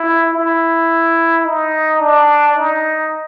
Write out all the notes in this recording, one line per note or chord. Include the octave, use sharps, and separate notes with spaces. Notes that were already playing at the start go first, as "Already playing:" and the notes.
Already playing: E4
E4
D#4
D4
D#4